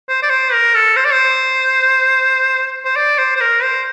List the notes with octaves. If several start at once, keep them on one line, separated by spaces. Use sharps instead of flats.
C5
D5
C5
A#4
A4
C5
D5
C5
C5
D5
C5
C5
A#4
C5